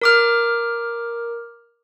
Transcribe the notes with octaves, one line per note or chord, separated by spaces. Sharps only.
A#4 D6 F6